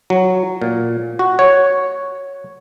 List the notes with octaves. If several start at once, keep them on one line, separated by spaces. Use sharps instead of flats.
F#3
A#2
F#4
C#5